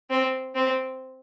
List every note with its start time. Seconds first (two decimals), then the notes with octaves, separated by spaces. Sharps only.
0.10 C4
0.55 C4